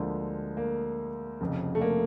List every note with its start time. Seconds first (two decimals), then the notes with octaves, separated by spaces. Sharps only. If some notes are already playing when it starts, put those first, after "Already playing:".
Already playing: D2 D3 F3 G#3 A#3
0.57 A#3
1.41 F1 F2 C#3
1.75 A3
1.81 A#3